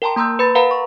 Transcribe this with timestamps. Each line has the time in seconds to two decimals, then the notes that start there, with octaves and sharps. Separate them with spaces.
0.02 A#4 G5 A5 A#5 C6
0.16 A#3 A#5 C6 E6 G6
0.39 B4 B5 A6
0.55 A#4 B4 F5 F#5 A#5 B5
0.71 C#6